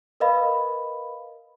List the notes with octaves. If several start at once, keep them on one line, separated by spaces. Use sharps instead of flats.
A#4 B4 D#5 F5 B5